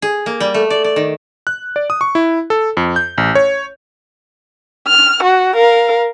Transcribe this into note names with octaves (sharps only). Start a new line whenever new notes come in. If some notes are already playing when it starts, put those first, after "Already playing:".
G#4
A#3
G3
A3
D5
D5
D#3
F#6
D5
D#6
C#6
E4
A4
F2
G6
A1
C#5
F6
F#4
A#4 F5